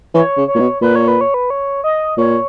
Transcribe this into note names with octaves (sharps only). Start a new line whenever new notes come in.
E3 C#5
C#3
C#5
A#2
B2
A#2 B4
C#5
B4
C#5
B4
C#5
D#5
A#2 C#5